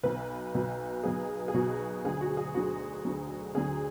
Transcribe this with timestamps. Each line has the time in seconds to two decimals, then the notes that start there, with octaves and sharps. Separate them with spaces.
0.03 B1 B2 F#3 B3 B4
0.54 B1 B2 F#3 B3
1.04 B1 B2 F#3 B3 G#4
1.48 G#4
1.54 B1 B2 F#3 B3 F#4
2.04 D2 D3 F#3 G#4
2.21 F#4
2.37 G#4
2.54 D2 D3 F#3 F#4
3.05 D2 D3 F#3
3.55 D2 D3 F#3 G#4